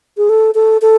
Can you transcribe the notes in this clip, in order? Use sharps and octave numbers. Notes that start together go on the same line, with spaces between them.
G#4
A4
A4
A4